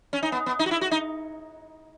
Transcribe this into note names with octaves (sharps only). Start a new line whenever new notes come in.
C#4
D#4
B3
B3
D#4
F#4
E4
F#4
D#4